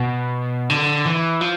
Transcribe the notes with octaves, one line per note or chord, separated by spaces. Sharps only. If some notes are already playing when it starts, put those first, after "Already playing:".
Already playing: B2
D3
E3
F3